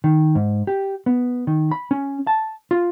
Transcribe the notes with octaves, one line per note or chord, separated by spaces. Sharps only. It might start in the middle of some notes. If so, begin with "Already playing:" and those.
D#3
G#2
G4
B3
D#3
B5
C#4
A5
F4